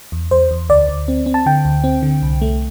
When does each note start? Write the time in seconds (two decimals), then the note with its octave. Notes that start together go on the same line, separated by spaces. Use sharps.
0.12 E2
0.31 E2 C5
0.51 E2
0.69 D2 D5
0.89 D2
1.08 C4
1.26 C4
1.34 A5
1.46 D3 G5
1.65 D2
1.84 C4
2.02 D3
2.22 C2
2.42 A3